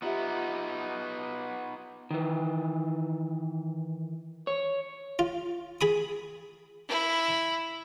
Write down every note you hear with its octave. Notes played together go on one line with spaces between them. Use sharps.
B3 D#4 F4 G4 E5
D#3 E3
C#5
F4
G#4 B5 D#6
E4